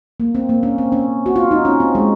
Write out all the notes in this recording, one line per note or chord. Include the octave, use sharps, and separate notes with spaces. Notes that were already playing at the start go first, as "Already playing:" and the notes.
A#3
C4
A#3
C#4
C4
C#4
F#4
F4
D#4
C#4
C4
G#3